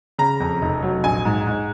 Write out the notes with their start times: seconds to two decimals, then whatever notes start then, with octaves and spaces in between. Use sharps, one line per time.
0.18 C#3 A#5
0.40 F2
0.62 F1
0.82 F#3
1.04 A#1 G#5
1.25 G#2
1.47 G#2